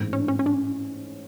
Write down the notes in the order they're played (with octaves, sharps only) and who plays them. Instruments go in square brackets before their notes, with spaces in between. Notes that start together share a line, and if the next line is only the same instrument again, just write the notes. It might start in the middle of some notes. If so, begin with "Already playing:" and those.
Already playing: [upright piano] A1 G#2 E3
[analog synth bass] C#4
D4
C#4
C#4
D4
C#4